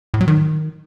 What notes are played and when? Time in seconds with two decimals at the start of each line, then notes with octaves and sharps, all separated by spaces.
0.14 A2
0.21 F#3
0.28 D#3